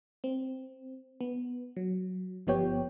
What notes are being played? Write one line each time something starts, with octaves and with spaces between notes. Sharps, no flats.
C4
B3
F#3
G1 F3 B3 G4 C#5 G5